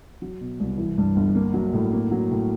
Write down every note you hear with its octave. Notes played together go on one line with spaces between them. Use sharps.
F#3
B2
C2
E3
G2
G1
A#3
F#3
A2
A#3
F#3
A2